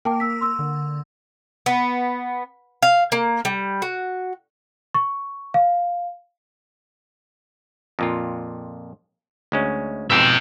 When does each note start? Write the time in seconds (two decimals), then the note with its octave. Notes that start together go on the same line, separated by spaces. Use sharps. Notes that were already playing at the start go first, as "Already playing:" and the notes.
0.05 A#3 A#4 G5 A5 D6
0.20 E6 B6
0.41 C6 E6
0.59 D3
1.66 B3
2.82 F5
3.12 A#3
3.45 G3
3.82 F#4
4.94 C#6
5.54 F5
7.99 F2 A#2 F4
9.52 D2 G#3 C#4
10.10 F2 G#2 B2 E5 G5